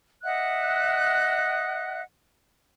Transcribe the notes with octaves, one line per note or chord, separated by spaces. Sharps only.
D#5 E5 F#5 F#6